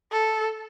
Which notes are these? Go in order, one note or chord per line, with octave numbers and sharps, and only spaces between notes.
A4